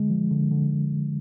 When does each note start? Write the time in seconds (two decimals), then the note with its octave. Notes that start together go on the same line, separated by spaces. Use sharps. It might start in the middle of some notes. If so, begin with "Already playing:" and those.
Already playing: D3 G#3
0.10 F3
0.31 D3
0.51 D3